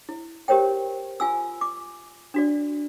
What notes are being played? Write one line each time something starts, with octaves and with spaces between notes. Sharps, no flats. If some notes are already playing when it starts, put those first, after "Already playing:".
E4
G4 A#4 C5 C#5 G5
F4 G#5 E6
D6
D4 F#4 D5